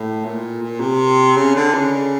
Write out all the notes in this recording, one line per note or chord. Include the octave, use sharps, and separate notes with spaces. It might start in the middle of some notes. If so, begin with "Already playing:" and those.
Already playing: A2
A#2
A#2
C3
C#3
D3
C#3